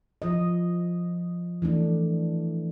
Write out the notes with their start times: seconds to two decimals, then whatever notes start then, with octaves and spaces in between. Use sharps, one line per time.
0.22 F3 D#5
1.62 E3 A3 D4